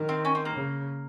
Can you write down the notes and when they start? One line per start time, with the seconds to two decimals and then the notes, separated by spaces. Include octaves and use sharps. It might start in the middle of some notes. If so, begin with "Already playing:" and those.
Already playing: D#3
0.09 C4
0.25 C#4
0.35 C4
0.45 A#3
0.56 C#3